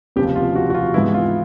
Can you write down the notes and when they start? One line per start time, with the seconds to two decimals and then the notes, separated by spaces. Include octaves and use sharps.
0.16 F1 D#2 C#3 F3 G4
0.36 F4
0.55 F#4
0.70 F#4
0.74 F4
0.94 G#2 E3 G#3 B3 E4
1.14 F4